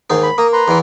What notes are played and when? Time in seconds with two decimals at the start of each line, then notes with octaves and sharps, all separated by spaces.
0.10 D#2 G#2 D#4
0.23 B5
0.38 A#3 A#5 D#6
0.53 B4 A#5 C6
0.68 E2 E3